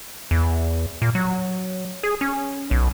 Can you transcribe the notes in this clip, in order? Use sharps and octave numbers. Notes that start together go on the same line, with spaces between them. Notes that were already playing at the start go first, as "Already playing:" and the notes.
E2
A#2
F#3
G#4
C#4
B1